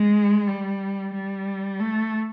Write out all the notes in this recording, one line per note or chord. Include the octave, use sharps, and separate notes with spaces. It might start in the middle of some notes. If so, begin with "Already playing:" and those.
Already playing: G#3
G3
G3
A3